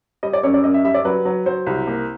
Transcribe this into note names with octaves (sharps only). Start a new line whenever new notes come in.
G3 D#5
D5
F#2 C#5
D5
F#2 D#5
E5
G3 E5
D5
F#3 B4
F#3
F#3 C5
C2
A#3